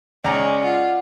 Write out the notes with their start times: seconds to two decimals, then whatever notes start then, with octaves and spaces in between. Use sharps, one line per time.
0.24 C#2 G#3 C#4 D5 A#5
0.63 F4 F#5